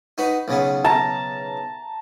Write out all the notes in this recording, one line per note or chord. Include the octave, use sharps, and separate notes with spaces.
D#4 F#4 B4
B1 C#3 B3
A5 A#5